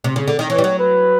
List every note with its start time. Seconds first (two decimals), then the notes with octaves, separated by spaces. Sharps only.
0.04 C3
0.16 C#3
0.28 D3
0.39 D#3
0.50 E3 C#5
0.58 G3
0.64 F#3
0.79 B4